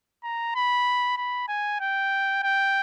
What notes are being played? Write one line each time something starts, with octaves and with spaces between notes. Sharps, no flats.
A#5
B5
B5
G#5
G5
G5